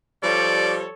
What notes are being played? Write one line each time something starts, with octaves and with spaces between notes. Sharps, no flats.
F3 G3 A4 C#5 D5